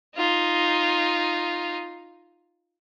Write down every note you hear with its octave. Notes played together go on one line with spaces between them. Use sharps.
D#4 F4